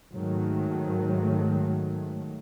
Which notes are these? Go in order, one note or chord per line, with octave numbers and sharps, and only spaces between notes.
G#2 D#3 F#3 A3